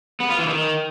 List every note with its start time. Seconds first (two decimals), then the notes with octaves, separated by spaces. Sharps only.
0.20 B3
0.29 F4
0.39 E3
0.48 D#3